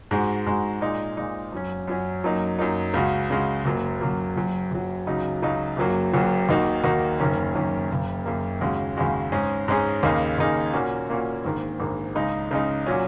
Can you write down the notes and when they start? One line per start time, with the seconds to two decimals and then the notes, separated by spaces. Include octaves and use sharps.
0.11 G#2 G#3 F#4
0.46 G#2 G#3 F#4
0.81 A#2 G#3 D#4
1.17 A#2 G#3 D#4
1.52 F#2 F#3 C#4
1.87 F#2 F#3 C#4
2.24 F#2 F#3 A#3 D#4
2.59 F#2 F#3 A#3 D#4
2.94 C#2 C#3 G#3 F#4
3.30 C#2 C#3 G#3 F#4
3.65 F#1 F#2 F#3 A#3
4.01 F#1 F#2 F#3 A#3
4.36 F#1 F#2 F#3
4.71 F#1 F#2 F#3
5.07 C#2 C#3 F#3 D#4 F#4
5.42 C#2 C#3 F#3 D#4 F#4
5.77 F#1 F#2 F#3 A#3 F#4
6.13 F#1 F#2 F#3 A#3 F#4
6.49 D#2 D#3 A#3 D#4 F#4
6.84 D#2 D#3 A#3 D#4 F#4
7.20 F#1 F#2 D#3 A#3 C#4
7.55 F#1 F#2 D#3 A#3 C#4
7.91 F#1 F#2 C#3 A#3
8.26 F#1 F#2 C#3 A#3
8.61 D#2 C#3 G#3 F#4
8.97 D#2 C#3 G#3 F#4
9.32 G#2 G#3 C#4 G#4
9.68 G#2 G#3 C#4 G#4
10.03 D#2 C#3 A#3 D#4 G#4
10.38 D#2 C#3 A#3 D#4 G#4
10.73 A#2 A#3 C#4 F#4
11.09 A#2 A#3 C#4 F#4
11.45 A#1 G#2 D#3 A#3
11.80 A#1 G#2 D#3 A#3
12.15 C#2 C#3 G#3 D#4
12.51 C#2 C#3 G#3 D#4
12.86 A#2 F#3 C#4